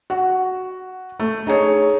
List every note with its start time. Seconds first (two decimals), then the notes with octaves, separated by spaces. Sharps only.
0.10 F#4
1.20 A3
1.47 D#4 G#4 C#5